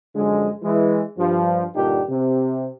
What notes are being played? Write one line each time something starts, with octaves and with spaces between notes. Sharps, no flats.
F#2 D3 F3 G#3
E3 G#3
G2 F3
G2 A#2 D3 D4 D#4 G4
C3